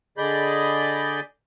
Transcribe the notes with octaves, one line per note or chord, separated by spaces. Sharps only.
D3 G#4 D5 D#5 B5 G6